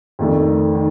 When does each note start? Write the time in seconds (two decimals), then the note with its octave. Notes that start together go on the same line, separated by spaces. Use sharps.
0.19 F2 D#3 A3 D4
0.75 D#3